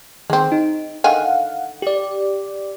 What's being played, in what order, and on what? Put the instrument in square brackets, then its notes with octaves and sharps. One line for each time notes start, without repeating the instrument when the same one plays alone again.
[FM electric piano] D#3 [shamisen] G#3 C4
[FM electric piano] D#4
[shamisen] D3 D#3 G#5 [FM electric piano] F5 F#5
[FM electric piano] G4 D5